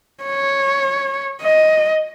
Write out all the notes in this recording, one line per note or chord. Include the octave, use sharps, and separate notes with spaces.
C#5
D#5